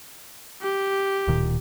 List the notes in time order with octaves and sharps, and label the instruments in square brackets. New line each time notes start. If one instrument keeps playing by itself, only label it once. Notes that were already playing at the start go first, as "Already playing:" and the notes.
[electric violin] G4
[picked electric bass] D1 A#2 D#3